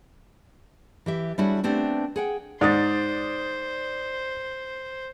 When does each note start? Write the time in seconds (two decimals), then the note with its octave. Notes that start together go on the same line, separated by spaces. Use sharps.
1.06 E3 G4 E5
1.38 G3 D4 E4 F#4 G#4 C#5
1.64 A3 B3 C4 D4 G4
2.16 G#4 F#5 G5
2.61 G#2 C5 D5 D#6 A6